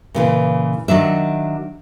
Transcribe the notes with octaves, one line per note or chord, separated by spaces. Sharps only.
A#2 C#3 E3
D#3 F#3 D4 E5